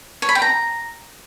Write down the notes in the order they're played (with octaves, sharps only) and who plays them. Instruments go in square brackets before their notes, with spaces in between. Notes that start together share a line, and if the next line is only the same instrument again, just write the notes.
[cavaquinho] C#5
B5
G5
A#5